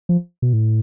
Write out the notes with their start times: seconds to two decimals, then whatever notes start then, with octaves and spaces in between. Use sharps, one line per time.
0.09 F3
0.42 B2
0.53 A2